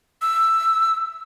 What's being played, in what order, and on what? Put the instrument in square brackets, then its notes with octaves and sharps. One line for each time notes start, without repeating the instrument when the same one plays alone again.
[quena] E6